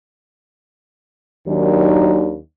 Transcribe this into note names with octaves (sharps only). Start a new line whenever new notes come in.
D#2 D#3 F#3 D4